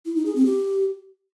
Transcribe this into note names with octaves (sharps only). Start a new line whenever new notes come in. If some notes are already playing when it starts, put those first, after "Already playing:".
E4
D#4
G#4
C4
G4